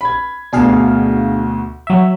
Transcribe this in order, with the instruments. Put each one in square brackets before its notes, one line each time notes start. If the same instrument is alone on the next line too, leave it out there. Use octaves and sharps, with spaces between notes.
[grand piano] B5 G#6
[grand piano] D2 B2 [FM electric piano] D4 G#4 F5
[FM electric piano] F#3 E5